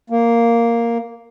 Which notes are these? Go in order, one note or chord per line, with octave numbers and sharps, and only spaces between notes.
A#3